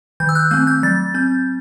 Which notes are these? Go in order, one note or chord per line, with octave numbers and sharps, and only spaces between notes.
D#3 G6
E6
F#6
A3 C4 G6
G6
F#3 A6
C4 G6